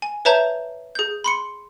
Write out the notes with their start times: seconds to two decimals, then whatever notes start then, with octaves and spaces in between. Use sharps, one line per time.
0.02 G#5
0.25 B4 C#5 E5 A5 A#5 G6
0.95 G#4 G6
1.24 B5 C6 C#7